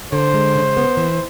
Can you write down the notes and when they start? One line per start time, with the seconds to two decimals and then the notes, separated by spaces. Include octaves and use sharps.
0.12 D3 C5
0.34 G#3
0.55 C#3
0.77 B3
0.97 E3